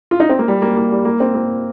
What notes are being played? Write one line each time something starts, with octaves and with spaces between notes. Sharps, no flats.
F4
D#4
C4
A#3
G3
A#3
A#3
G3
A#3
C4
A#3